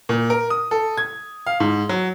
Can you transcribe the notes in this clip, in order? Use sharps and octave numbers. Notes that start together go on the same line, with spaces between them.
A#2
A#4
D#6
A4
G#6
F5
G#2
F#3